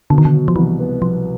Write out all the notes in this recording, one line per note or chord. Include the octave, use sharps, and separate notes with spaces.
B2 D3
D#3
D3
F#3
F3
C2 E3
B3
B2 F3